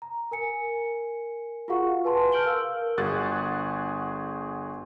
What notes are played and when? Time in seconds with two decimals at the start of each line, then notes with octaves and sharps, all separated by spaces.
0.02 A#5
0.31 A#4 G#5 C#7
1.68 F4 F#4 G#4 F5 F#5 C#6
2.05 B4 G#5 A5 C6
2.32 F6 G6 D7 F#7 G7
2.46 A#4 F5 E6
2.97 G1 F#4 G#4 F#6 A6